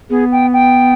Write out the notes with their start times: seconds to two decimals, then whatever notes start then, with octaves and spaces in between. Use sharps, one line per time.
0.10 B3 G#4
0.32 G5
0.53 G5